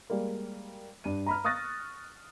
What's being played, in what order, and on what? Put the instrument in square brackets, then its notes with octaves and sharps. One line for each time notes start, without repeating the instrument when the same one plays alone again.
[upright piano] G3 G#3 A#3
G2 D#7
A#5 B5 F6
C#6 D#6 F6 F#6 A6 A#6